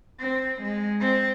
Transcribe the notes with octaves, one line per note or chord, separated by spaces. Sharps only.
C4
G#3
C4